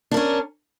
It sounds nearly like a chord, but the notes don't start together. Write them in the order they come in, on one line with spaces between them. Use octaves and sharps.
D4 A#4 C#4